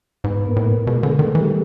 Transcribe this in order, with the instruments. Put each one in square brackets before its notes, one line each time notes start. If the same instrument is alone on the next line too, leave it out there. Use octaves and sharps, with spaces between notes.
[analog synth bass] G#2 [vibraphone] B3 B4
[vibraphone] A#3 A#4
[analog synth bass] A2
[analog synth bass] B2 [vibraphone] G#3 G#4
[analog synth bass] D3 [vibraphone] G#3 G#4
[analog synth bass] D#3 [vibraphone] A3 A4
[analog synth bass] E3 [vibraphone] G3 G4